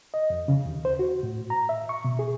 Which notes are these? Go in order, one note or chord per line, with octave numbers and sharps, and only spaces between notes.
D#5
F2
C#3
D#2
C5
F#4
A2
A#5
E5
C#6
B2
G#4